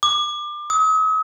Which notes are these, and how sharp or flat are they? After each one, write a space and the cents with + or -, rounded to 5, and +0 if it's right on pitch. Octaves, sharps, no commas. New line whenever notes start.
D6 +30
D#6 +45